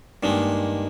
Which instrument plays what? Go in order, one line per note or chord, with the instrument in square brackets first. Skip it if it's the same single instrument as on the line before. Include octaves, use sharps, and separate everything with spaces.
[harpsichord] G2 D#3 G#3 [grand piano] A#3 D4